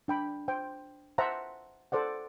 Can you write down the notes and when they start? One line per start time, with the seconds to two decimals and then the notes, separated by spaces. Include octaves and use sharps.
0.08 D4 G5 B5
0.48 C5 G5
1.18 C5 E5 F#5 A5 A#5
1.92 A4 C5 D5 F#5